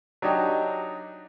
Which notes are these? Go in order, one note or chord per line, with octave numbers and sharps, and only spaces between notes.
F#3 D4 D#4 G4